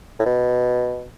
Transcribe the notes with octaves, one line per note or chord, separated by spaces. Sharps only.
A2
B2